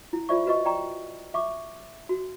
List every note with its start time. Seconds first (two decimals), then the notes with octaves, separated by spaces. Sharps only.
0.13 E4
0.29 F4 C5 D5 E5 C#6
0.46 F#4 B4 D#5 C#6
0.65 D5 G5 A#5 C#6
1.34 E5 C#6 D6
2.09 F#4